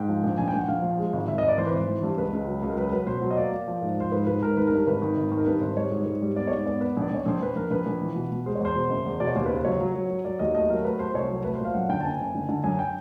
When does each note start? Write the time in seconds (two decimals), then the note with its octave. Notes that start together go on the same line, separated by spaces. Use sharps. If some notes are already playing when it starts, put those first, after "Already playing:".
Already playing: G#2 G5
0.09 F3
0.23 A#1
0.38 A#1 G#5
0.48 G5
0.53 A#1
0.59 F#5
0.68 A#1 F5
0.82 F3
0.98 G#3
1.13 G#1
1.28 G#1 E5
1.38 D#5
1.42 G#1
1.48 D5
1.58 E3 C5
1.67 B4
1.73 G#1 C5
1.88 E3
2.03 G2
2.17 C#2 B4
2.33 C#2
2.47 F#3
2.62 C#2
2.70 A#4
2.77 F#3 B4
2.92 F#3 B4
3.07 B2 C5
3.22 F#3
3.31 D#5
3.37 A#3 D5
3.52 A#3
3.68 F3
3.82 G#2
3.98 F3 C5
4.12 G#2 B4
4.26 G#2 B4
4.41 G#2 A#4
4.57 D#3 B4
4.67 A#4
4.72 G2
4.77 A#4
4.87 G#1 B4
5.02 D#3
5.17 G#1
5.32 D#3
5.38 A#4
5.46 G2 B4
5.61 G#1 C5
5.77 G3 C#5
5.91 G#2
6.06 G#2
6.22 G3
6.36 B3 D5
6.47 C#5
6.52 G#2 D5
6.66 B3 D5
6.81 B3 B4
6.97 A#1
7.02 D5
7.11 A#1 C#5
7.26 A#1 C5
7.40 A#1 B4
7.55 A#1 A#4
7.70 A#1 B4
7.86 A#1
8.01 E3
8.15 B2
8.31 B2
8.46 G#3 C5
8.55 C#5
8.61 E2 C5
8.75 B2
8.90 F#1
9.06 E2
9.20 B2 D5
9.27 C#5
9.35 D#2 C5
9.46 B4
9.50 C#3 C5
9.65 F#3 C#5
9.80 F#3
9.95 F#3
10.10 F#3
10.25 F#3 D5
10.39 D#2 D#5
10.54 A3 D#5
10.70 F#3 A#4
10.85 A3 B4
10.99 A3 C5
11.14 C2 C#5
11.29 F#3
11.44 A3 B4
11.55 C5
11.60 A#2 F5
11.74 F#2 F#5
11.89 D3 G5
12.00 A5
12.05 F#1 G#5
12.20 F#1
12.35 D3
12.49 D3
12.64 F#2 G#5
12.79 G5